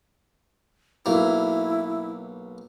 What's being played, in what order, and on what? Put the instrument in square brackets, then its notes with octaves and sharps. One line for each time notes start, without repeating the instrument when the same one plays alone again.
[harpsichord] B1 A#3 [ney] E4